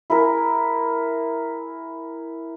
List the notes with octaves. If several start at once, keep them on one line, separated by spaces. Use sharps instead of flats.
E4 G#4 A#4